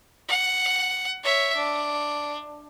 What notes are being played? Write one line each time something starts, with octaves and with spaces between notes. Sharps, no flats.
F#5
C#5 E5
D4